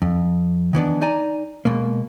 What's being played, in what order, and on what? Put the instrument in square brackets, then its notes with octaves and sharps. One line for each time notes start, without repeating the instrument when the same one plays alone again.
[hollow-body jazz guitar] F2
D#3 E3 B3 D4
D#4 D5 G#5 A#5
B2 G#3 A#3